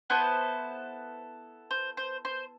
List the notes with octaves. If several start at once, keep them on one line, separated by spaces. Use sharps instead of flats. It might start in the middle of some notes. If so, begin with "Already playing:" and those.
B3 E4 A4 C5
C5
C5
C5